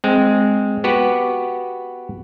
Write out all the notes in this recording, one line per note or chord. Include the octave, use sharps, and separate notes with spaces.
G#3 C4
B3 F#4 G4 B4